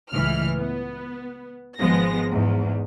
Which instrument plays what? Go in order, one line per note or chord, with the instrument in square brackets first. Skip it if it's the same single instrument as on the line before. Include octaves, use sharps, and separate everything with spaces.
[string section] C#2 A2 E3 F6
B3
G#1 F3 G#3 B3 A#6
E2 G#2